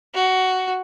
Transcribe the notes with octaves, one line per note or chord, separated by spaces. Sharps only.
F#4